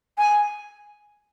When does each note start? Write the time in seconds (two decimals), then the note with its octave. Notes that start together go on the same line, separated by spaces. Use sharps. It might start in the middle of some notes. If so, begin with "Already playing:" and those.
0.18 G#5